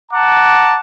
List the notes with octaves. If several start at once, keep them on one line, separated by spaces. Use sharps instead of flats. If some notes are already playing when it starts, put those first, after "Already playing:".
F#5 A5 A#5 D6